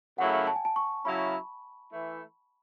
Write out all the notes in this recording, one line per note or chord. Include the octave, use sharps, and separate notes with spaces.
F#2 C#3 F#3 A3 E4 F#5
A5
G#5
A5
C#6
C#3 F#3 C#4 E4 B5
E3 A3 E4